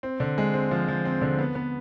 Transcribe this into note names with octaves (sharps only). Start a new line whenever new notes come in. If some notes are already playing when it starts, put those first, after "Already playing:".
C4
D3
G#3
C4
F3
F3
C4
D3
B3
B3